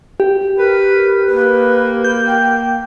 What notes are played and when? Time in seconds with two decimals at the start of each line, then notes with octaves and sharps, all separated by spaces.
0.20 G4
0.58 A#4 B4
1.27 A#3 B4
2.04 G6
2.27 G5